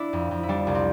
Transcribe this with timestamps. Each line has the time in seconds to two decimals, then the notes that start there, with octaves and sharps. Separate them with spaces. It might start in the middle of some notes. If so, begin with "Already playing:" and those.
Already playing: D4 E4
0.13 F2
0.31 F2
0.43 E4
0.49 G3 D4
0.67 C2
0.75 C4